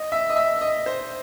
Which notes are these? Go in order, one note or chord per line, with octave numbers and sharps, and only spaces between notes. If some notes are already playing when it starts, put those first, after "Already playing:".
Already playing: D#5
E5
D#5
E5
D#5
C5